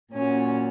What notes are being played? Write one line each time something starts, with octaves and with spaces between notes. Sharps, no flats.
A#2 F#3 C#4